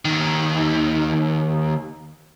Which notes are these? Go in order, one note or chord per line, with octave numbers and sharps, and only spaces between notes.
D#2 D#3